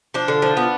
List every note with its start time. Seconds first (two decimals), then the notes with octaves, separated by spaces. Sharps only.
0.14 F3 D4
0.28 D3
0.42 F3
0.57 B3